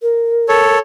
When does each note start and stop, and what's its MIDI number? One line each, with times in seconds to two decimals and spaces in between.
0.02 0.76 70
0.49 0.79 69
0.49 0.79 73